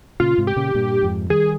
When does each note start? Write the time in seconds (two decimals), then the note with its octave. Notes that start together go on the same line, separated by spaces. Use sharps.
0.20 A#2 C#3 F4
0.38 G#2 C3
0.47 G4
0.56 A#2 C#3
0.75 G2 A#2
1.03 F2 G#2
1.30 D#3 G3 G#4